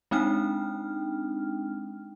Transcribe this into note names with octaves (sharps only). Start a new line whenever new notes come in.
G#3 C4 D4 D#4 G5 F6